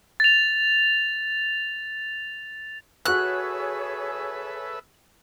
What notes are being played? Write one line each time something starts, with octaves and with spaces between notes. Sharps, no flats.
A6 F7
F#4 G#4 A4 B4 C#5 E5 C#6 F#6